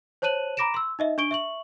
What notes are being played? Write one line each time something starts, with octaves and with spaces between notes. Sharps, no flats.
C5 C#5 A5 F#6 D#7 F#7
A#5 B5 D6 A#6 D7 E7
C6 E6
D#4 D#5 E5
D4 C#6 D7 G7
E5 C#6 F#7